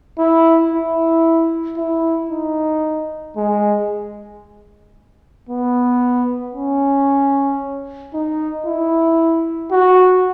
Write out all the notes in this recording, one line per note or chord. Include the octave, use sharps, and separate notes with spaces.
E4
E4
E4
D#4
G#3
B3
C#4
D#4
E4
F#4